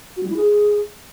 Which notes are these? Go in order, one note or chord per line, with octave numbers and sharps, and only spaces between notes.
F#4
G3
E4
G#4